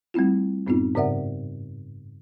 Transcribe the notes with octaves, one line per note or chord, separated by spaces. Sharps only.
G3 A3 C4 E4 F4
F#2 A2 B3 C4 D#4 F4
G#2 C#3 A#4 D5 E5 F#5